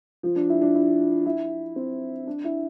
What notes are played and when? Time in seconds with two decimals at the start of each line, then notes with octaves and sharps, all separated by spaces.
0.23 F3
0.36 D4
0.49 E4
0.61 D4
0.75 E4
1.26 E4
1.76 C4
2.27 D4
2.44 E4